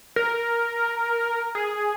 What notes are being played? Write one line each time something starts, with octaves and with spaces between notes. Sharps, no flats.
A#4
G#4